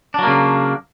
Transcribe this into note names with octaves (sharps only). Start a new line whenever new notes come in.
C#3 F#3 A#3 D4